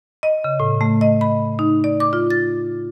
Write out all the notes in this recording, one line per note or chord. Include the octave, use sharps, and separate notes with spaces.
D#5
C#3
A2
A3
D#5
B5
D#4
D5
D6
F4
A6